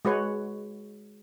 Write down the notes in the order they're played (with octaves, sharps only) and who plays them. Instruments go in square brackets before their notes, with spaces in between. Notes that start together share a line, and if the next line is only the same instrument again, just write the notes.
[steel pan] G#3 F#4 B4 C#5